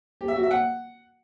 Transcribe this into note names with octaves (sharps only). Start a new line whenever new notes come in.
G4
E5
F#4
E5
F#5